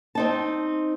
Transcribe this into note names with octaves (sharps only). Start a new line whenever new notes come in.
C4 D#4 A5